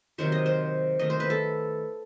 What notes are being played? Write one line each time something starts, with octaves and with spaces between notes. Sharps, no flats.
C3 D#3 F#3 C5
D#5
C5
D#3 A3 D#5
C5
B4
A4